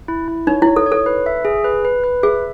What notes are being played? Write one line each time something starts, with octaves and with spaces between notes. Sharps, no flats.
E4
E4
D#4 C#5
E4
C#5
A4
C#5
A4
B4
E5
G#4
B4
B4
B4
G#4 E5